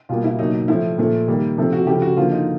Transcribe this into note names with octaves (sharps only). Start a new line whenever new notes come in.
B2 G3 A#3 F4
E4
B2 F#3 A#3 D#4
D#4
A2 F3 A3 E4
A#2 F3 A3
D#3 G3 A#3
C3 F3 A3
F#4
C#3 F3 A3 G4
F#4
D3 F3 A#3 F4
D#4